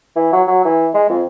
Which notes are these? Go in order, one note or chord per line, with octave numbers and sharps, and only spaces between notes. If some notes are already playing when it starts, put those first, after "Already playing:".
E3
F#3
F#3
E3
G#3
F2